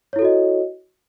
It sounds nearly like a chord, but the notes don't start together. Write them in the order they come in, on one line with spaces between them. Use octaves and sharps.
C#5 E4 A4 F#4 D#5